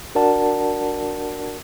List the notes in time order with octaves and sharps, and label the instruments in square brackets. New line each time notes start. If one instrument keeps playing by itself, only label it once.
[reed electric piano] D4 F#4 A#4 D5 F#5 A5